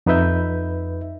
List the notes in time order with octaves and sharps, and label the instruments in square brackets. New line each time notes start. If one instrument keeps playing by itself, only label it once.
[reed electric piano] F2 D#4 B4 E5 G6